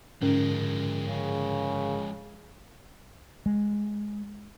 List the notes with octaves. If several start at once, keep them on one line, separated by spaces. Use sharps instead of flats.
G#2 D3 F3 G#3 C#4 A#4
C#3
G#3